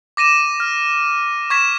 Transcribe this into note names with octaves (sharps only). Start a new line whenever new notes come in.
D6 A#6 D#7 E7
F6
C#6 G#6 B6 E7